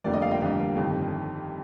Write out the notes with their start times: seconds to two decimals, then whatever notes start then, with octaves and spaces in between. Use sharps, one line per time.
0.04 F1 F2 D3 G3 A#3 D5
0.13 D#5
0.22 D5 F5
0.31 D#5 G5
0.40 F1 F2 D3 G3 A#3
0.76 G1 F2 C3 D#3